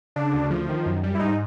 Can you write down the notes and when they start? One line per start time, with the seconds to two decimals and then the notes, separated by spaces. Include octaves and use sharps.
0.16 C#3 D4
0.33 D2
0.50 F3
0.69 D#3
0.86 F#2
1.03 G3
1.15 E4
1.19 G#2 D#4